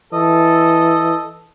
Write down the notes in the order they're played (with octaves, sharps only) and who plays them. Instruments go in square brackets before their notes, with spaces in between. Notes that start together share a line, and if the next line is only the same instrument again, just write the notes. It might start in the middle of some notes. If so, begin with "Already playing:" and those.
[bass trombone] E3 [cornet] A4 [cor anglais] D#5